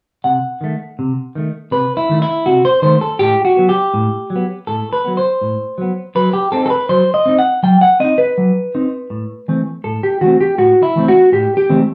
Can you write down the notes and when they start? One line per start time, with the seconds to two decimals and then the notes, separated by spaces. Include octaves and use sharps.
0.24 C3 F#5
0.61 D#3 A3
0.99 C3
1.35 D#3 A3
1.71 C3 B4
1.97 E4
2.09 D#3 A3
2.22 E4
2.46 C3 F#4
2.65 C5
2.82 D#3 A3 C5
3.01 A4
3.19 A2 G4
3.45 F#4
3.57 F#3 B3
3.69 G4
3.94 A2
4.30 F#3
4.36 B3
4.67 A2 A4
4.93 B4
5.04 F#3 B3
5.17 C5
5.42 A2
5.78 F#3 B3
6.15 F#3 B4
6.33 G4
6.52 C4 D#4 A4
6.66 A4
6.70 B4
6.89 F#3 C5
7.14 D#5
7.26 C4 D#4
7.39 F#5
7.63 F#3 G5
7.81 F#5
8.00 C4 D#4 D#5
8.18 B4
8.38 F#3
8.75 C4 D#4
9.10 A2
9.48 E3 A3 C4
9.84 A2 A4
10.03 G4
10.21 E3 A3 C4 F#4
10.41 G4
10.58 A2 F#4
10.83 E4
10.96 E3 A3 C4
11.08 F#4
11.32 A2 G4
11.57 G4
11.69 E3 A3 C4